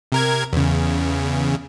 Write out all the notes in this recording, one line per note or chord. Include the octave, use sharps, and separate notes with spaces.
C3 A#4 G#6
E2 C#3